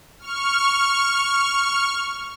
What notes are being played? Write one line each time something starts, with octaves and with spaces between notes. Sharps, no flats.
C#6 F6